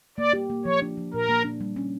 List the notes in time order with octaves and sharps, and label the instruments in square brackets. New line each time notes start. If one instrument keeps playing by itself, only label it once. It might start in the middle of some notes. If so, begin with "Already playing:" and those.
[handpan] A#3 [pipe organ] D5
[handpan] G4
A#3
[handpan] F3 [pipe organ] C#5
[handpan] D4
F3
[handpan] A#2 [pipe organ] A#4
[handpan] A#3
D4
G3
C#4